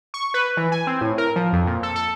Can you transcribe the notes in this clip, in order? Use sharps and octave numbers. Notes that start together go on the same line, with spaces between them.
C#6
B4
E3
G#5
C4
A2
A#4
F3
F2
A#2
A4
A4